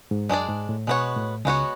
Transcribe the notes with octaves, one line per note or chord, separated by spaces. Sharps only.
G#2
F#2 G#3 D4 G#4 D5
G#2
A2
B2 G#3 B3 F#4 C#5
A2
C#2 C#3 G#3 B3 F#4 C#5